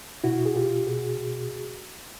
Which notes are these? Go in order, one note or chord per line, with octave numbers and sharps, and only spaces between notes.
B2 E4 F#4
G#4
B2 F4 G4
B2 F#4 G#4
B2